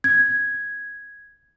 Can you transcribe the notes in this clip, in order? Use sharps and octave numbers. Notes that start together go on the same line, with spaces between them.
G#6